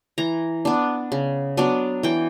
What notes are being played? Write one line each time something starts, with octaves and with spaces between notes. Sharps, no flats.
E3 A#5
B3 D4
C#3
F#3 B3 D4
E3 G5